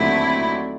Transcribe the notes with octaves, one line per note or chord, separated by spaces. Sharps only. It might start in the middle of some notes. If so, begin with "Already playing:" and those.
Already playing: D#2 D3 F#3 A3 C4 E4